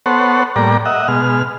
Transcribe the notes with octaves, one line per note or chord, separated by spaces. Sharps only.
B3 A4 C5 C#5 F#5
A2 G3 A#3 D5 A#5
D#5 E5 F#5
B2 G#3 F6